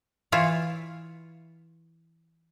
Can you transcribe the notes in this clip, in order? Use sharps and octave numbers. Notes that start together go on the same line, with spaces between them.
E3 E4 F4 C#5